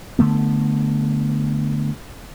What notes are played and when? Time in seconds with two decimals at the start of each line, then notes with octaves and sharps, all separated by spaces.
0.19 D3 A3 B3